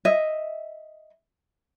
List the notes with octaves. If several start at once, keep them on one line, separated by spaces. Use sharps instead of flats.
D#5 E5